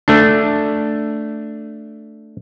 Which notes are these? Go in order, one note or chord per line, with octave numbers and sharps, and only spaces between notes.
A3 D4